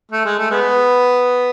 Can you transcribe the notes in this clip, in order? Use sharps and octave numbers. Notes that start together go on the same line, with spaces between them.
A3
G#3
A3
G#3 B3